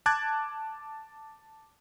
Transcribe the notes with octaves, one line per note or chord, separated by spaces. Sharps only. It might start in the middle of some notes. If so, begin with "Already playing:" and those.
A5 D6 F#6 G#6 A6